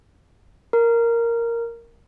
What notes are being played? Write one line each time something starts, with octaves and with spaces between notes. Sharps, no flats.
A#4